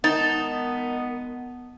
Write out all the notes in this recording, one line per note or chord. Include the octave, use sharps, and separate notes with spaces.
D#3 G#3 B3 D#4 A5